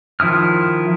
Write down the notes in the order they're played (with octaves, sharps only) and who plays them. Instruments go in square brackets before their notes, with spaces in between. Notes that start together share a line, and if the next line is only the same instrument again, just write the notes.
[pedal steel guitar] D#3 F3 E4 D#6 F6